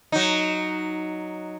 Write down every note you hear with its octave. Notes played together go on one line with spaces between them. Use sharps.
F#3 D#4